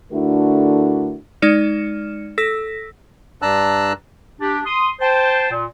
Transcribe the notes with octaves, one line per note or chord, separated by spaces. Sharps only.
D3 A3 D4 E4 F#4 A#4
G#3 D#4 D5 F6 C#7 E7
A4 E6 A#6 B6
G2 D4 A5 A#5 E6 F#6
D4 G4
C6 D#6
C5 G5 A5
A#2